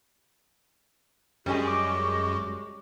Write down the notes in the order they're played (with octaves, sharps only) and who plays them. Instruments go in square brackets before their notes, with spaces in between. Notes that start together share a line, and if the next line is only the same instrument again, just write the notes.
[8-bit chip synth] F#2 G#3 [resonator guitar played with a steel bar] G3 C#4 G#4 [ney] F#4
[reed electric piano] D6